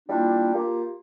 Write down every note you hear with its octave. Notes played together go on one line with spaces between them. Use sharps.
G3 A#3 D4 E4 F4
A#3 F4 G4